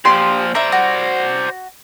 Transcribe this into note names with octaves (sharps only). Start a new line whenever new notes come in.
A#2 F3 G4 C6
C5 D5 E5 A#5
F#4